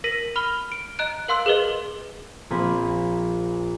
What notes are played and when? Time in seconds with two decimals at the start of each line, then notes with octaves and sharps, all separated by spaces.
0.04 A#4 A#6 B6 D#7
0.36 B5 F6 G7
0.72 D7
0.99 D#5 A#5 F#6 D7
1.28 A#4 F5 C6 E6 F#6
1.46 G#4 A#4 B4 D#5 G7
2.50 A#1 A#3 C4 G#5 B5